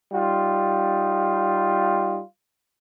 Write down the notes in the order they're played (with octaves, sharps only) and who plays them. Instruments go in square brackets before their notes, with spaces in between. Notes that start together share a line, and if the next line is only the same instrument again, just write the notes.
[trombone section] G3 D#4 F4